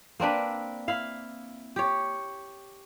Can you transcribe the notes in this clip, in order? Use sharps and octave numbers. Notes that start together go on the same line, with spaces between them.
A#3 C4 D4 B4
E4 F5
G4 C#5